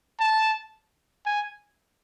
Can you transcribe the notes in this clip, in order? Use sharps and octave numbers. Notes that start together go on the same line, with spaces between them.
A5
G#5